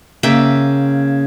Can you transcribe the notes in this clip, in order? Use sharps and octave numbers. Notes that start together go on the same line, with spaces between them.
C#3 A#3 E5 G5